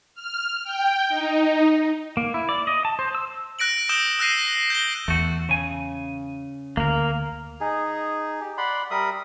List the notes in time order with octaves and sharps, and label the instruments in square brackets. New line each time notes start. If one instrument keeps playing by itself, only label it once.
[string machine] F6
G5
D#4
[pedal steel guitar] A#3
E4
D5
D#5
A5
C5
E6
[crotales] F#6 A#6 D7 F#7
D#6 E6 G6 D7 E7 G7
E6 F#6 A#6 C7 D#7
G6 A#6 G7
[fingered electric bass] E2 [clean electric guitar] A3 F#4
[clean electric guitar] C#3 G#5
[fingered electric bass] D2 [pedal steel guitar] A#3 A#4
[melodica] D#4 G#4
G4
D5 F#5 B5 C6
G3 A#4 E5 D#6